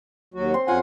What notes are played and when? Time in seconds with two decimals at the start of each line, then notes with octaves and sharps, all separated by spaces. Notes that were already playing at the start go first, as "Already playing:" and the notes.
0.34 D#2 F#3 F#4
0.54 C4 C6
0.68 F2 C#4 F4 F#5 G#5 A#5